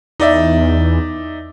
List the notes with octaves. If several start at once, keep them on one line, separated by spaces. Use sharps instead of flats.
E2 D#4 D5 E5